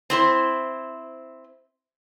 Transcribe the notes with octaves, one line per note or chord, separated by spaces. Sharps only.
C4 E4 C5